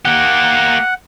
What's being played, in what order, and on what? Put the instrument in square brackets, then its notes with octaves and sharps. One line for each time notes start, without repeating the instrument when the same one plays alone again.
[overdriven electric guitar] A#3 G4 [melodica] F#5